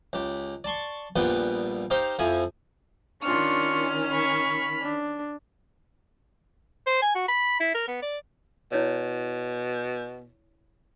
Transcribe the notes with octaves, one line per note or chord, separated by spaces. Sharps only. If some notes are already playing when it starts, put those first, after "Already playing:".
C#2 G4
D5 A5 C6 C#6
A#1 A#2 G3 B3 B4 C6
D#4 G4 C5 F5 G5 C6
F2 F3 E4 G#5
D#3 C#4 D4 F4 C#6 F6
B5 C#6
D4
C5
G#5
F#4
B5
E4
A#4
B3
D5
B2 E4 C#5 D5